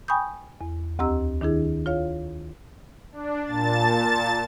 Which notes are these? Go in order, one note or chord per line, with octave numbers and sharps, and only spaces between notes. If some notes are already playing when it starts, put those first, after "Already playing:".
G5 G#5 B5 C#6 D#6 G6
E2
D2 C4 G4 D#5 A#5 E6
D#3 D4 E4 G#4
F4 C#5 F5
D4
A#2 A5 A6